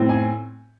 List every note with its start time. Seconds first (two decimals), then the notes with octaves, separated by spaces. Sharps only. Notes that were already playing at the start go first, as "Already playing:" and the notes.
Already playing: A2 C4
0.09 G#5